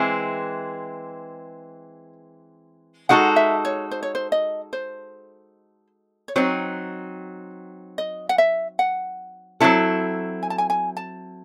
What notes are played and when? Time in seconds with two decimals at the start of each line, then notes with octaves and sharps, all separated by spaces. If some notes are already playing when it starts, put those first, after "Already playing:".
Already playing: E3 G#3 C4 E5
3.09 G#3 D#4 F#4 A4 F#5
3.36 E5
3.65 C#5
3.91 C5
4.03 C#5
4.15 C5
4.32 D#5
4.73 C5
6.28 C#5
6.36 F#3 C4 D#4 C5
7.98 D#5
8.29 F#5
8.38 E5
8.79 F#5
9.60 F#3 C4 E4 A4
10.43 G#5
10.50 A5
10.58 G#5
10.70 G#5
10.97 A5